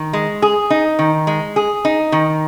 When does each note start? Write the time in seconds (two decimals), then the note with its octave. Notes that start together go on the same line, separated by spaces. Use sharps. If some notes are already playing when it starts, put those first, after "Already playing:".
Already playing: D#3
0.13 G#3
0.42 G#4
0.70 D#4
0.99 D#3
1.27 G#3
1.56 G#4
1.85 D#4
2.12 D#3